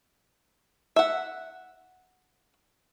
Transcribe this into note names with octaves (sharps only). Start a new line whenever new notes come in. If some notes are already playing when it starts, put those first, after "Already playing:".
E5 F#5